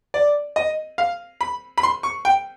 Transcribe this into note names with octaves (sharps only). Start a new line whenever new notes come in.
D5
D#5
F5
B5
B5
C6
C#6
G5